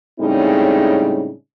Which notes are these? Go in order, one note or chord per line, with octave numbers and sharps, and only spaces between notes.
A2 C#3 G3 G#3 C4 D#4